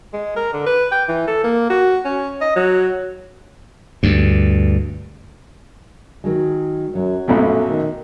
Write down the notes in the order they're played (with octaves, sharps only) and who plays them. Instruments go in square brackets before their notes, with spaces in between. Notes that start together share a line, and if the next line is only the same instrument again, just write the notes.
[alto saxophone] G#3
A#4
D3
B4
G5
E3
A4
A#3
F#4
C#4
D#5
F#3
[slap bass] D2 G2
[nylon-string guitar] D#3 F#3 G#3
[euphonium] F#2 [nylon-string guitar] F#3
[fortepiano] A#1 F#2 B2 [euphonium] A3
[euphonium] D#3